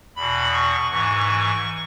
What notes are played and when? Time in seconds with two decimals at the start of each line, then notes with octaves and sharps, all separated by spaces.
0.16 E2 B2 B5
0.54 C#6
0.91 G#2 E3 C#6